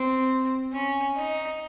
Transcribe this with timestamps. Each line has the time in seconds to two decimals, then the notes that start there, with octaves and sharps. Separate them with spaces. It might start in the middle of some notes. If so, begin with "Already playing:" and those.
Already playing: C4
0.73 C#4
1.17 D#4